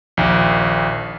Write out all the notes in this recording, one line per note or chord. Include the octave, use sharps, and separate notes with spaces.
A#1 D#2